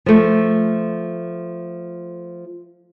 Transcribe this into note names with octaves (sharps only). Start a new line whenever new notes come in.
F3 A3